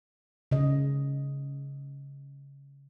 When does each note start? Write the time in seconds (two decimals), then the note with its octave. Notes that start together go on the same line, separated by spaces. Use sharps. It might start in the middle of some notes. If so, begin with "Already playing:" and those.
0.51 C#3 D#5